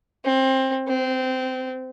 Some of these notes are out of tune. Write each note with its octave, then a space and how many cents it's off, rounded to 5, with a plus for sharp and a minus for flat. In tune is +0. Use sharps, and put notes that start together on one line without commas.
C4 +20
C4 -20